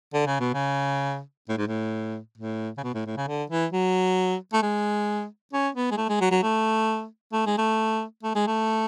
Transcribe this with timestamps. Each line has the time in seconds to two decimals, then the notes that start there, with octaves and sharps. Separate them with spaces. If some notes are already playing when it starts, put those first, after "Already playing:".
0.14 D3
0.26 C#3
0.40 B2
0.54 C#3
1.49 A2
1.58 G#2
1.68 A2
2.38 A2
2.77 C#3
2.83 B2
2.94 A2
3.06 A2
3.17 C#3
3.28 D3
3.50 E3
3.72 F#3
4.53 A3
4.62 G#3
5.53 C#4
5.75 B3
5.91 G#3
5.97 A3
6.09 G#3
6.21 F#3
6.31 F#3
6.43 A3
7.33 A3
7.46 G#3
7.58 A3
8.23 A3
8.35 G#3
8.47 A3